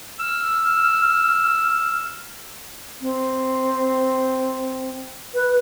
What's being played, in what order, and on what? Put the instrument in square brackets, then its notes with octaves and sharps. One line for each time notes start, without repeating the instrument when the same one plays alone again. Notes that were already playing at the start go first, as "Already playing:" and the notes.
[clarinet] E6 [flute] F6
[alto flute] C4
B4